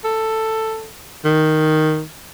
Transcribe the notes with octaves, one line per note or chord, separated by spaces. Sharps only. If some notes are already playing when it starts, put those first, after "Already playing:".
A4
D#3